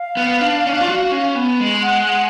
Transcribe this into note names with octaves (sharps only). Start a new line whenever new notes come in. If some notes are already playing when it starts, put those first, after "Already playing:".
Already playing: F5
B3
D4
C#4
D4
F4
F#4
C#4
B3
G#3
F#5
F#5